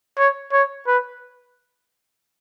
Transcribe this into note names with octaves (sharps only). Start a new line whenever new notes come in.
C#5
C#5
B4